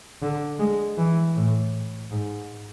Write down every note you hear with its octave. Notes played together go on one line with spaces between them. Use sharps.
D3
G#3
E3
A2
G#2